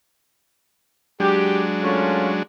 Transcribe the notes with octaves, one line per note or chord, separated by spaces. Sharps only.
F#3 G#3 D4 G4
A3 C#4 F4